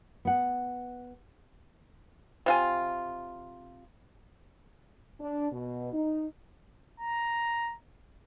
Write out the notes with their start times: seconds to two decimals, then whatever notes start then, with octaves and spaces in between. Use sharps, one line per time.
0.25 B3 F#5
2.46 C3 F4 G#5
5.19 D4
5.51 B2
5.93 D#4
7.00 A#5